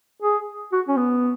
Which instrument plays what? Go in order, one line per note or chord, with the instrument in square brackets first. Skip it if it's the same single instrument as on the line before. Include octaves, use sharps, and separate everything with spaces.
[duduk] G#4
F#4
C#4
B3